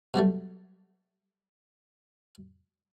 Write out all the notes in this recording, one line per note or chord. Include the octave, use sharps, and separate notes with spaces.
B2 F#3 G3 A3